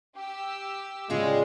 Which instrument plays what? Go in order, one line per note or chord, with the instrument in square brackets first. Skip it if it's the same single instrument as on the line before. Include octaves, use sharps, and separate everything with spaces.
[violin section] G4 E6
[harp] A2 G3 [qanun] C#3 F4 C#6 [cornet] G#3